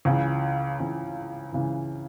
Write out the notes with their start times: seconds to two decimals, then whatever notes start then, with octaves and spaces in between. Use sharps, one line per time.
0.05 C#2 C#3 E3
0.80 C#2 C#3 E3
1.52 C#2 C#3 E3